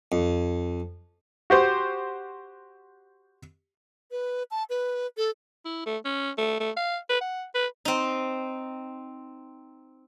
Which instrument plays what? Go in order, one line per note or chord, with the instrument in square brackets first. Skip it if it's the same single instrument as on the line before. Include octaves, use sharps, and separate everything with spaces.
[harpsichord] F2
[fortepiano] F#4 G4 C5
[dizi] B4
A5
B4
A4
[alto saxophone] E4
A3
C#4
A3
A3
F5
B4
F#5
B4
[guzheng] C4 D#4